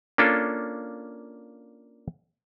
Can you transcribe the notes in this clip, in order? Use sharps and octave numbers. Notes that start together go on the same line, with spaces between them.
A#3 C#4 D4 F4 A4